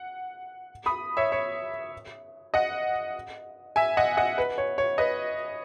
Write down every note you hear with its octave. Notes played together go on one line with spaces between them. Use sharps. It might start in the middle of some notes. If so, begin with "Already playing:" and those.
Already playing: F#5
B5 D#6
C#5 E5
C#5
D#5 F#5
E5 G#5
D#5 F#5
D#5 F#5
B4
C#5
C#5
B4 D#5